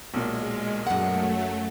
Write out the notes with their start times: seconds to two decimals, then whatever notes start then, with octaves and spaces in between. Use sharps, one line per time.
0.14 B1 A#2 G#3
0.87 F#2 F#3 A3 F#5